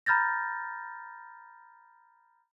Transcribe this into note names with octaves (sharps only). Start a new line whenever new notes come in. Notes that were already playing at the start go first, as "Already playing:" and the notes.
A#5 B5 F6 G6 A6 A#6